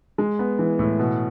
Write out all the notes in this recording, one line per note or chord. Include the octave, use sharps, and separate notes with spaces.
G#3
B3
E3
A2
B2